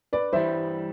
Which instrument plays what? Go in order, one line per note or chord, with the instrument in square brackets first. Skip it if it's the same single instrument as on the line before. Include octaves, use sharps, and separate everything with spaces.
[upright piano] B4 D5
[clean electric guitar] G2 E3 G3 [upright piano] C5 E5